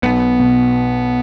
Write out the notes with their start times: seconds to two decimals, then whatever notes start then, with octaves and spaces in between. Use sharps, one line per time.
0.03 B1 B3
0.39 B2